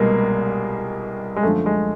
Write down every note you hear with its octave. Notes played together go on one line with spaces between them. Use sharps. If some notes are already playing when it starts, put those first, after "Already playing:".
Already playing: C2 B2 G3 G#3 A#3
G#3
F#2 D3 F3 A3
G#3